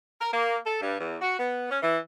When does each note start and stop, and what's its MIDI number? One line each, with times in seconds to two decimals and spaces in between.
0.20 0.32 70
0.32 0.56 58
0.65 0.80 69
0.81 0.99 43
0.99 1.16 40
1.21 1.35 66
1.38 1.69 59
1.70 1.78 61
1.82 1.97 52